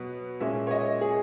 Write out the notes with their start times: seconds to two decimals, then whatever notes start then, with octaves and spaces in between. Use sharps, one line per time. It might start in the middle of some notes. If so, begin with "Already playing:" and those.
Already playing: B2 F#3 B3
0.40 A#2 G#3 C#4 E5
0.67 C#5
0.71 D#5
1.01 G#4